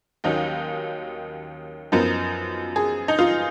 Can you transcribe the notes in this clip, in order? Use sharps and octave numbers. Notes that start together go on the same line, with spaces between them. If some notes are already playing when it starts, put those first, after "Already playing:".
D#2 D#3 F#3 C#4 D#4
F#2 F3 B3 D#4 A#4
G#4
D#4
F4